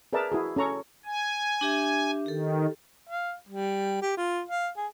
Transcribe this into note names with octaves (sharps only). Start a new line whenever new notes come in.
G#4 A#4 B4 D5 E5 A5
E4 F#4 G#4
C#4 A4 A#5 C#6
G#5
D4 G4 E5
D#3 G4 A4
F5
G3
G4
F4
F5
G#4